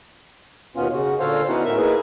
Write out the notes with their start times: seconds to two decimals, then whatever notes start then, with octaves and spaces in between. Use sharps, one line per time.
0.76 D#2 B2 B3 C#4 F4
0.93 C#3 F#4
1.20 A#2 D3 A4 C5 C#5 F5
1.48 B3 C#4 D#4 E4 F#4 F#5
1.65 A2 A#4 E5
1.77 A#3 D#4 E4 G#4 B4